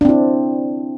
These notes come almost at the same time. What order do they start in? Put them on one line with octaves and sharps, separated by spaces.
D4 C4 E4